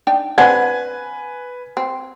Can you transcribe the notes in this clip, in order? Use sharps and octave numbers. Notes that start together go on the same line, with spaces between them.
D4 D#4 G5
C4 D4 B4 F#5 G#5 G#6
C4